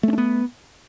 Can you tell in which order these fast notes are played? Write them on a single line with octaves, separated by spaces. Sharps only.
A3 C#4 D4 B3